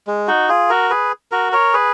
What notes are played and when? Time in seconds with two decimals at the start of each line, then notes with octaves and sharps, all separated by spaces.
0.07 G#3
0.28 D#4 F#4
0.49 F4 G#4
0.69 F#4 A#4
0.90 G#4 B4
1.32 F#4 A#4
1.52 A#4 C#5
1.73 G#4 B4